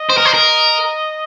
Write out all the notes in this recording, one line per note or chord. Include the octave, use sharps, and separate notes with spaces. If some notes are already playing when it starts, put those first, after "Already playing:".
Already playing: D#5
C5
A#4
C5
A#4